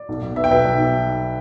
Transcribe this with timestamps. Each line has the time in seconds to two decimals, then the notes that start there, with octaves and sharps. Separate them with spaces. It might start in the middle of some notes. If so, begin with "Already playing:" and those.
Already playing: D5
0.09 B1
0.22 B1
0.36 B3 E5
0.44 G5
0.50 B2 B4 E5
0.65 B1
0.78 B1